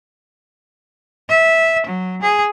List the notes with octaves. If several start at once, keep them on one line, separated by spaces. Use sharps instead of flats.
E5
F#3
G#4